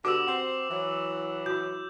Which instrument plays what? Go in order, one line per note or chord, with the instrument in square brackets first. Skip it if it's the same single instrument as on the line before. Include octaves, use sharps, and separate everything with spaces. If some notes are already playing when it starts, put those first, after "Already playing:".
[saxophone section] D3 G3 B3 [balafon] F#4 G4 [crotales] D6 E6
[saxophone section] C4 C5 [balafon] F#5
[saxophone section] E3 F#3
[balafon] E4 F#4 [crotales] G6